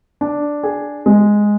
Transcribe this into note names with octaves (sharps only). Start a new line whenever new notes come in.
D4
G#4
G#3